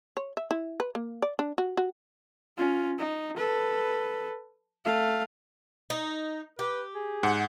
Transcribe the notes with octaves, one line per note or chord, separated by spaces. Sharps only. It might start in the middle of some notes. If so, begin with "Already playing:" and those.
C#5
E5
E4
B4
A#3
D5
D4
F#4
F#4
C#4 F4
D#4
A4 B4
A3 F5
D#4
G4 B4
G#4
G#2 F#5